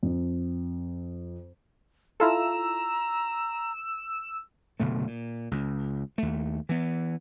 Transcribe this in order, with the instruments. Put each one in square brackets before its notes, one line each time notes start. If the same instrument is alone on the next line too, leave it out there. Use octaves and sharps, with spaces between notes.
[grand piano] F2
[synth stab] E4 F4 A4 [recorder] A#5 [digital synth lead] E6
[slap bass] F#1 B2 D3 A3
A#2
C#2
D#2 A3
E3 B3